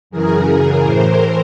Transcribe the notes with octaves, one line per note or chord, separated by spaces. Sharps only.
F#2 C#3 E3 G#4 A#4
A2 E3 A#4 C5